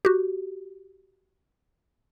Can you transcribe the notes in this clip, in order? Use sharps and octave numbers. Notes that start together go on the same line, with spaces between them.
F#4 G4